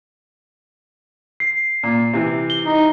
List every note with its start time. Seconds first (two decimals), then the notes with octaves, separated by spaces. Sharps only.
1.40 C7
1.83 A#2
2.13 C3 E3
2.50 G7
2.65 D#4